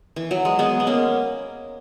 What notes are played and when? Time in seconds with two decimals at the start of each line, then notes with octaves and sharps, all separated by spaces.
0.16 E3
0.31 F#3
0.45 G#3
0.59 G#3 B3
0.80 B3
0.87 A#3 C#4